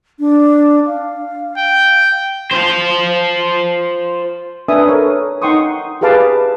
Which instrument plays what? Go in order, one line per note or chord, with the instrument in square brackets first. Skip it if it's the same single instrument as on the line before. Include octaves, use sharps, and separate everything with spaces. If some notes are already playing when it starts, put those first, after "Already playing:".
[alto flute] D4
F5
[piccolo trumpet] G5
[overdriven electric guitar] F4 C5
[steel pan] D4 B4 E5 G#5 D#6
A4 A#4 C#5
D#4 F#5 G5 C6 C#6 D#6
G4 G#4 B4 F5 A5 D6